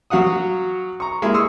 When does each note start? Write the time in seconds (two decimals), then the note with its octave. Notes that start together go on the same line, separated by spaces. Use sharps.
0.10 F#3 F#4 F5 F#5 D#6
1.00 A#5 C#6
1.22 G#3 A#3 E4
1.34 C6 C#6 D#6 E6